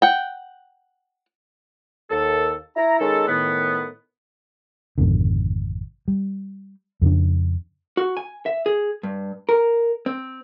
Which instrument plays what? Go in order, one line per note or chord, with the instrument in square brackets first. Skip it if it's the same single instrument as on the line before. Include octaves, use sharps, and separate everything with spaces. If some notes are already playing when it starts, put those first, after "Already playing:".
[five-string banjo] F#5 G5
[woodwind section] D#2 A4
E4 A#5
D#3 G#3 C#4 D#4 A4
A2 D#3 B3
[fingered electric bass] G#1 F2 B2 D3
G3
F2 C#3 D4
[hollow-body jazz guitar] F#4
G#5
E5
G#4
G2
A#4
C4